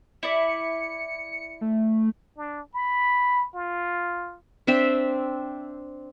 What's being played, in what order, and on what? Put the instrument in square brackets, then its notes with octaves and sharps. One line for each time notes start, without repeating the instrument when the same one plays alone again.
[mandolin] E4 D5 [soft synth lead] C#7
[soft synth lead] A3
[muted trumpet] D4
B5
F4
[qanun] C4 D4 E5 G5